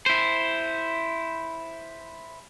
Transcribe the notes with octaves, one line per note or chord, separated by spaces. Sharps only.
E4 C5